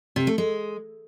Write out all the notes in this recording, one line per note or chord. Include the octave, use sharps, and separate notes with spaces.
C3
A3
G#3